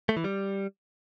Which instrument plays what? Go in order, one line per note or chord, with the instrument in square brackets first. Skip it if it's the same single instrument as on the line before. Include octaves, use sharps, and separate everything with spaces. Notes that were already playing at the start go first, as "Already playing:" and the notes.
[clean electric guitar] A3
E3
G3